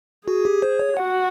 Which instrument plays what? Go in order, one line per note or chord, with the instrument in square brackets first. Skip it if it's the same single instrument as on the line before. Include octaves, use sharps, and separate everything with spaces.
[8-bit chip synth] F#4 [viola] G#4
[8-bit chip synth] G4
C5
C#5
[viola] F#4 [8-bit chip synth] F#5